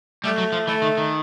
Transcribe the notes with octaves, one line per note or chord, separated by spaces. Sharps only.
G3 A3
F#3
F3
E3 A3
D#3
D#3